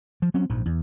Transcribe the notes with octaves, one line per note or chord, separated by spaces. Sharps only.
F3
F#3 C4 C#4
A#1 G#2 F3
E2